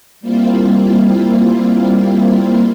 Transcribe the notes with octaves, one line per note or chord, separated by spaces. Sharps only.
G3 A#3 C4 E4 F4